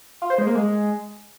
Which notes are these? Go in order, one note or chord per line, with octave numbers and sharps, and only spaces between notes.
F4
C5
G#3
A#3
G#3